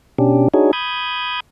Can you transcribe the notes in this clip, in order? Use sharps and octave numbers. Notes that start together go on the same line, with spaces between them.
B2 C#4 D4 G4
D4 D#4 F#4 G#4 C#5
B5 D#6 G6 G#6